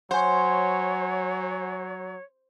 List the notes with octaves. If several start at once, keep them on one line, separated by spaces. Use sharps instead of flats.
F#3 C5 C#5 F#5 G#5